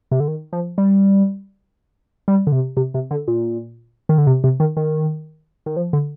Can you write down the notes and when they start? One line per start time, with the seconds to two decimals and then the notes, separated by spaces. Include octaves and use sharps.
0.11 C3
0.20 D3
0.28 D#3
0.53 F3
0.78 G3
2.28 G3
2.47 D3
2.52 C3
2.77 C3
2.94 C3
3.11 D3
3.28 A#2
4.09 D#3
4.18 D3
4.27 C3
4.44 C3
4.60 D#3
4.77 D#3
5.66 D#3
5.77 F3
5.93 D3